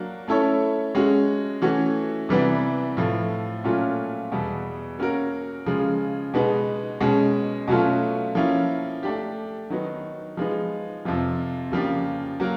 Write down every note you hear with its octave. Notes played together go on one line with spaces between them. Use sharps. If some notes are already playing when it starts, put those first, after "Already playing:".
Already playing: F#3 A#3 D4
A3 C#4 E4 A4 C#5
G#3 C#4 F#4
E3 A3 C#4 F#4
C3 E3 G3 B3 D4
A2 F3 A3
A#2 F#3 A3 C#4 F4
E2 B2 G3
A#3 C#4 F#4 A#4
C#3 F3 G#3
B2 G#3 B3 D#4
B2 G#3 C#4
B2 F#3 A3 C#4 F4
F3 A#3 C#4 E4
A3 D4 G4
D#3 F#3 B3 D#4
F3 G#3 B3 D#4
F2 C3 F3
C#3 F3 A#3 D4 G4
F#3 A#3